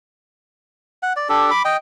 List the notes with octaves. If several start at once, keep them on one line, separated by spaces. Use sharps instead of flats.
F#5
D5
D4 G4 A4
B5 D6
D#5 G5